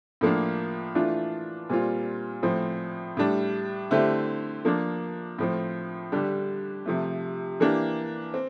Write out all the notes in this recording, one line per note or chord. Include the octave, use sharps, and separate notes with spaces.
A2 F3 A#3 D4
E3 A3 D4 F4
A#2 G3 C4 F4
A2 F3 C4
A2 G3 D4
D3 A3 C4 E4 G4
F3 A#3 D4
A2 F3 C4
D3 G3 D4 G4
C3 F3 A3
E3 A#3 D4 G4
C4